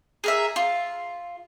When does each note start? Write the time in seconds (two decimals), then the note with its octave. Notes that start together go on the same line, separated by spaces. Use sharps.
0.24 G#4 A#4 E5
0.56 F4